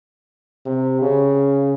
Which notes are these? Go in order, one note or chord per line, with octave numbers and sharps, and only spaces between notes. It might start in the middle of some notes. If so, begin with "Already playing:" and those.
C3
C#3